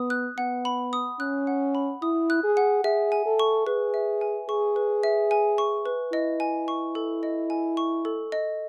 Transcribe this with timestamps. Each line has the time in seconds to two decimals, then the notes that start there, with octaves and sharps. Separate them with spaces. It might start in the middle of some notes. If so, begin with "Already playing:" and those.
Already playing: B3 D#6
0.10 F#6
0.38 B3 F#5
0.65 B5
0.93 D#6
1.20 C#4 F#6
1.47 F#5
1.75 B5
2.02 E4 D#6
2.30 F#6
2.44 G#4
2.57 F#5
2.84 G#4 E5
3.12 G#5
3.26 A4
3.39 C#6
3.67 G#4 B4
3.94 E5
4.21 G#5
4.49 G#4 C#6
4.76 B4
5.03 E5
5.31 G#5
5.58 C#6
5.86 B4
6.13 E4 D#5
6.40 G#5
6.68 C#6
6.95 A4
7.23 D#5
7.50 G#5
7.77 C#6
8.05 A4
8.32 D#5